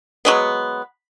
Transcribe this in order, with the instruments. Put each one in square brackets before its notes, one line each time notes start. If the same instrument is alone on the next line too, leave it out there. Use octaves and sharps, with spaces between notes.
[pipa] F#3 G#3 B3